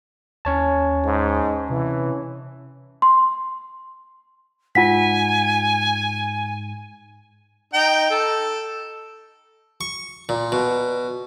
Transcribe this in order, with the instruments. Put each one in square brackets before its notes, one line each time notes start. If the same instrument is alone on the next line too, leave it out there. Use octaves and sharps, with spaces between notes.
[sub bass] D#2 [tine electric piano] C#4 C#5 A5
[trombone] G#2
[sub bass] C3 [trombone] E3
[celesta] C6
[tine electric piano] G#2 [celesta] F4 F#5 B6 [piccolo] G#5
[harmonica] D#4 G5
A4
[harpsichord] C#6
A#2
B2